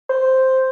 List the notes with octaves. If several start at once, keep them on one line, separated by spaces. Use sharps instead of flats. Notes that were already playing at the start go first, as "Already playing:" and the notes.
C5